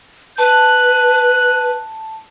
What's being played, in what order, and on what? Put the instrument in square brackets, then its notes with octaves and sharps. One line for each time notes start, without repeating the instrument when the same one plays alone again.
[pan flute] B4 [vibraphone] A5 [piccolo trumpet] F#6